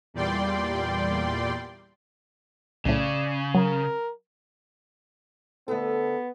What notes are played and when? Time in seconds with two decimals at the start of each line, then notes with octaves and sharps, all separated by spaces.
0.14 E2 A#2 G3 D5 G5 C6
2.85 B1 A2 C#3 D5
3.55 F#3 A#4
5.68 D2 B3 A4